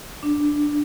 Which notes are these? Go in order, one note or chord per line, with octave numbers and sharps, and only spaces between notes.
D4